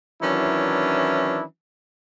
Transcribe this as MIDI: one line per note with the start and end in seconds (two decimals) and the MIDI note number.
0.22 1.43 51
0.22 1.43 52
0.22 1.43 54
0.22 1.43 61
0.22 1.43 62
0.22 1.43 64